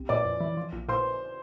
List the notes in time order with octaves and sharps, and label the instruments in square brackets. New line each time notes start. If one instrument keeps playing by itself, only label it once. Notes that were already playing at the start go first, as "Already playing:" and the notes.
Already playing: [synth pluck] C2
[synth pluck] A#2 [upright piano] D5 D6
[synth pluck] F2
E3
F3
A#1
[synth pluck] A#2 [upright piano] C5 C6